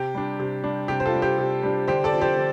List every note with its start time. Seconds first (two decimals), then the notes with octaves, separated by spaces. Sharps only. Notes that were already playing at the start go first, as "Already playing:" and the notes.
Already playing: C3 G4
0.15 G3 D4
0.40 C3
0.64 G3 D4
0.88 C3 G4
1.00 C5
1.05 F4 A4
1.14 G3 D4
1.22 G4 C5
1.38 C3
1.63 G3 D4
1.88 D3 G4 C5
2.04 A4 D5
2.13 F3 C4
2.21 G4 C5
2.37 D3